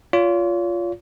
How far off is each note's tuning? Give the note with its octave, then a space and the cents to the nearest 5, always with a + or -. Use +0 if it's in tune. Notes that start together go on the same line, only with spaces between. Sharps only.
F4 +0 C#5 +45